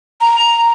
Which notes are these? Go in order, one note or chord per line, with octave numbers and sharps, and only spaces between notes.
A#5